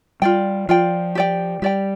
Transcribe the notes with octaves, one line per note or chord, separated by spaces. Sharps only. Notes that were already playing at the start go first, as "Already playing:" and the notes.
G3 F4 D5 G5
F3 F4 D5 G5
G4 D5 G5
G3 G4 D5 G5